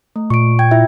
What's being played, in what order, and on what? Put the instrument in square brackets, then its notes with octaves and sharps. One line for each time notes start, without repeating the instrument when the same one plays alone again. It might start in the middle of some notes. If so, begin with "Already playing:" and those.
[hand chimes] A3
[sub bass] A#2 [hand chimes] C#6 D7
[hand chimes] G5 G#6
E4 F4 E5